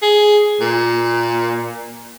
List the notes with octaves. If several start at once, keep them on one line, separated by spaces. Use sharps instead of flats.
G#4
A#2